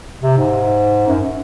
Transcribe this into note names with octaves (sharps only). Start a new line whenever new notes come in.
C3
G#2
F#2